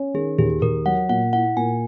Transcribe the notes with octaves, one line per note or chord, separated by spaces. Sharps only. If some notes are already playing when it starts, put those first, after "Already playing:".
Already playing: C#4
D#3 G#4
D#2 G#4
D#2 A#4
F#3 F#5
A#2 F#5
E4 F#5
A#2 G#5